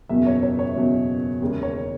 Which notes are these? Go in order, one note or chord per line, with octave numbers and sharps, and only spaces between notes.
F#1 E2 B2 E5
C#5
C#5
C#5
F#1 E2 B2
E1 D#2 C#3
C#5